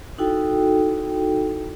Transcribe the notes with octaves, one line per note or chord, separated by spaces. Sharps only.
D#4 E4 F#4 A4 G5